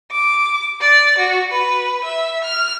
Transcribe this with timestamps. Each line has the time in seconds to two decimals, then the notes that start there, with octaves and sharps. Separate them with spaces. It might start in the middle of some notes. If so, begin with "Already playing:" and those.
0.12 D6
0.81 D5
1.18 F#4
1.52 B4
2.04 E5
2.44 F6